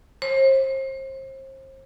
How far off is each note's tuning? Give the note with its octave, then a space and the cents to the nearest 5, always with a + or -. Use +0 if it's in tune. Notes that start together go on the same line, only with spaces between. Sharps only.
C5 +35